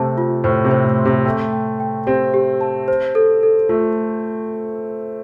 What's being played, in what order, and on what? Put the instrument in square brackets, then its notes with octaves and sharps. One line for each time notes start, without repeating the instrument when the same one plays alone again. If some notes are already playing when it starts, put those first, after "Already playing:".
Already playing: [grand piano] C3 A3 [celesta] C5 A5
[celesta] F4
[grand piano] A2 [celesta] C5
[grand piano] C3
[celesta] C5
[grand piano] A2
[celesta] C6
[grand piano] C3
[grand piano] A3 [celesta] G5
[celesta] G5
G5
[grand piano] C4 [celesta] G4
[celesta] G4
A5
C5
A4
A4
[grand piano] A3 [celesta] F4